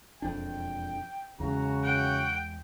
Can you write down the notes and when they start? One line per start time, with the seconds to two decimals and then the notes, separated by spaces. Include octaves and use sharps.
0.22 E1 F2 D4 G5
1.40 E2 C#3 G#3 F#4 A#5
1.84 F#5 G5